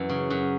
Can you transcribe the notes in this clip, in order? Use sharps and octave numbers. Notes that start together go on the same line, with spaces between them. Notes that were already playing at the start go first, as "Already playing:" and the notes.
Already playing: F#2 E3
C#3
F#2